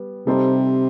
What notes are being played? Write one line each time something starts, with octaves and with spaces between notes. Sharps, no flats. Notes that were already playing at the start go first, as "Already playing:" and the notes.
Already playing: G3 B3
C3 G3 D#4 A4 C5